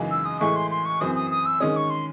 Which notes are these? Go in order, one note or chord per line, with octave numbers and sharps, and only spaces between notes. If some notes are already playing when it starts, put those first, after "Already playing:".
Already playing: F#2 C#3 E3 G#3 D#4
E6
D#6
A2 E3 G#3 C#6
C6
C6
C#6
F#2 E3 C4 D#6
D#6
D#6
E6
D#3 G#3 C#4 D#6
C#6
C6